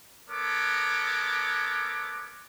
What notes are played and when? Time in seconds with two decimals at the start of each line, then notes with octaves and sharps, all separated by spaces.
0.29 B3 A4 A#4 C#5 D6